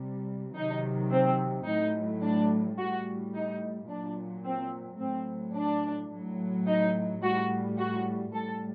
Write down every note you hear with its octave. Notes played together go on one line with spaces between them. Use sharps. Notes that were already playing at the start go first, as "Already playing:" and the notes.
Already playing: C3 G3
C3 D#3 F#3 D#4
C4
A2 F#3 D#4
D4
A2 G3 F#4
D#4
A#2 F#3 D4
C4
A2 F#3 C4
D4
A2 F#3
D#4
A2 G3 F#4
F#4
A2 G3 A4